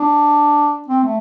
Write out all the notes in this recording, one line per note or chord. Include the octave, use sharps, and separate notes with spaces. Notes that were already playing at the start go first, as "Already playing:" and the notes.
Already playing: D4
C4
A3